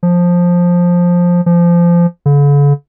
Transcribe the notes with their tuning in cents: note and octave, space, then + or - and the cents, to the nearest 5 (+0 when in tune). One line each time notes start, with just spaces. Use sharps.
F3 +10
F3 -20
D3 -45